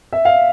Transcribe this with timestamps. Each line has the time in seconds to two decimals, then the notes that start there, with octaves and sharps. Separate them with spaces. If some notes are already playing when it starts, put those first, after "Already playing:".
0.13 E5
0.25 F5